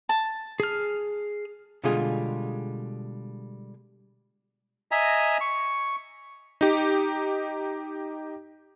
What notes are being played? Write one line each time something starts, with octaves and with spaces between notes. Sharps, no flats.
A5
G#4 F6
B2 D3 G3 G#3 F4 G#4
D#5 E5 G#5 A#5
C#6
D#4 G4